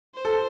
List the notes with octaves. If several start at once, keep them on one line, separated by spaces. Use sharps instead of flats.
C5
A4